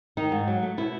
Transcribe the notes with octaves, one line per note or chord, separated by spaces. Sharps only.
D#3 D#4
G#2
F#3
A3
B2 E4